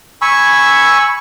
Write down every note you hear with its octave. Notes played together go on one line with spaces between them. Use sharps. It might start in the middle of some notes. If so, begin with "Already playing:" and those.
G#5 B5 C#6 E6